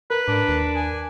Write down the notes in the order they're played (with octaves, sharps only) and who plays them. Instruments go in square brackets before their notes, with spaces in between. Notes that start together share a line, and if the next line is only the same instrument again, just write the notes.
[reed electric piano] A#4 [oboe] B4
[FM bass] G#2 [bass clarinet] D4
[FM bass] D#2
[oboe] G#5